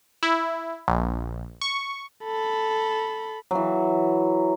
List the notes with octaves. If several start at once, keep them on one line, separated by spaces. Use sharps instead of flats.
E4
A#1
C#6
A4 B5
E3 F#3